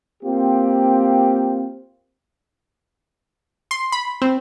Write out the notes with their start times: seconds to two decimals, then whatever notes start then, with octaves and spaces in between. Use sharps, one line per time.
0.23 A#3 C4 F4 G4
3.71 C6
3.92 B5
4.22 C4